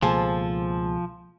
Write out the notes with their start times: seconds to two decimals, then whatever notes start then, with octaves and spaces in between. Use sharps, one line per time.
0.02 C#2 B2 F3 A#3 G#4 A4 C5